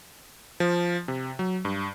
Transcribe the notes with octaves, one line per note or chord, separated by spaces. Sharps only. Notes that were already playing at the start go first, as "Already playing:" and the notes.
F3
C3
F#3
G2